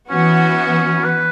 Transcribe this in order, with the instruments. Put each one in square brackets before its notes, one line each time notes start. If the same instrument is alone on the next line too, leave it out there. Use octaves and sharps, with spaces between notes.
[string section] E3 B3 F#4 [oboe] C#4
[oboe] B4